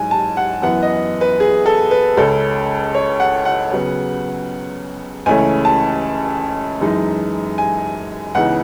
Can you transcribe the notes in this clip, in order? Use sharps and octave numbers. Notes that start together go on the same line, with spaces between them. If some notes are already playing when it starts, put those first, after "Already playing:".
Already playing: G#2 F#3 G#5
A5
F#5
F#2 E3 B3 F#5
D#5
B4
G#4
A4
B4
C#2 C#3 G#3 C#4 A4
C#5
F#5
F#5
C#3 F#3 B3
C#2 C#3 E3 A3 C#4 G#5
A5
F#2 E3 G#3 D#4
G#5
C#2 C#3 E3 B3 D#4 F#5